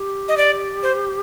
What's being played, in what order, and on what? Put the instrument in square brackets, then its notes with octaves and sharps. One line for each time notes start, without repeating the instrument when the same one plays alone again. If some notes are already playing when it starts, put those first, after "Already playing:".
Already playing: [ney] G4
[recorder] D#5
D5
C5